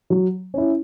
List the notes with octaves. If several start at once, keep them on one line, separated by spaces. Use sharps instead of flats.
F#3
C#4 E4